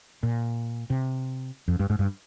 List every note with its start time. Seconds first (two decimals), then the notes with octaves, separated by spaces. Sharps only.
0.23 A#2
0.90 C3
1.68 F2
1.80 G2
1.90 G#2
1.99 G2